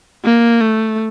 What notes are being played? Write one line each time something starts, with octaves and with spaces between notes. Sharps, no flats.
A#3
A3